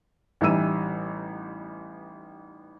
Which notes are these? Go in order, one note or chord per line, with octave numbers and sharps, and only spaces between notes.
A1 E3 G3 D#4 E6 D#7